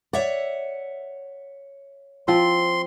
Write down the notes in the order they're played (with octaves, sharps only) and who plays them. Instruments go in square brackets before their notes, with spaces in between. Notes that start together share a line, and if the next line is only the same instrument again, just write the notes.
[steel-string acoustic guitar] C#5 E5 F#5 [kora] D5
[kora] F3 C4 [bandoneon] C6